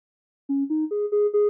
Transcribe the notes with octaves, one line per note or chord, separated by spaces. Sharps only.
C#4
D#4
G#4
G#4
G#4